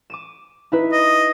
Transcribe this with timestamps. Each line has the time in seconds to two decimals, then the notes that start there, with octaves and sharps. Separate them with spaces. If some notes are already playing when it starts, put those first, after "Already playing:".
0.10 D6 D#7 E7
0.72 D#4 E4 B4
0.92 D#5